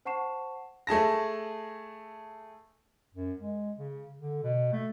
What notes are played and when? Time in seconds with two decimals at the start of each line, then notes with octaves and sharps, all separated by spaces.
0.05 C5 F#5 A5 C#6 C7 E7
0.87 A3 G#4 A5 A#6
3.14 F#2
3.39 G#3
3.78 C#3
4.19 D3
4.43 B2
4.72 A3